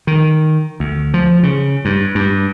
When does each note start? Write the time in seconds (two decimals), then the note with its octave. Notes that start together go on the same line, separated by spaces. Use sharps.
0.07 D#3
0.80 D2
1.14 F3
1.43 C#3
1.85 G2
2.15 G2